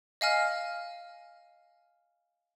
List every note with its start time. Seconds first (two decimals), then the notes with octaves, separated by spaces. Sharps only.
0.21 D#5 F5 G#5 F6